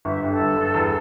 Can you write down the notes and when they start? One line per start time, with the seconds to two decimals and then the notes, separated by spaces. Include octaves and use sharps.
0.05 G1 E5
0.23 G2
0.29 A4
0.39 G1
0.56 G2
0.74 E2